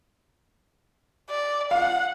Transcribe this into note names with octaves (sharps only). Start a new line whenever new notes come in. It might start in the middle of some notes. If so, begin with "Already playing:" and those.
D5
F5 F#5